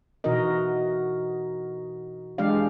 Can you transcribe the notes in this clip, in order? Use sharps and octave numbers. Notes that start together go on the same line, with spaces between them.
B2 E3 D#4 F#4 A#4 D#5
E3 G#3 D4 G4 D5 F5